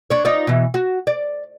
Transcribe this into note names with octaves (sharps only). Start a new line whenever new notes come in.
D4 C#5
D#4 F4 D5
B2 E3
F#4
D5